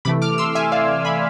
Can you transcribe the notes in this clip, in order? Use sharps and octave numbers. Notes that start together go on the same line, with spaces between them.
C3 E3 A3 B5 D6
D6 F6
C6 E6
E5 G#5
D5 F5
G#5 B5